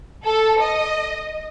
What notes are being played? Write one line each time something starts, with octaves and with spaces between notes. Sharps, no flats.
A4
D#5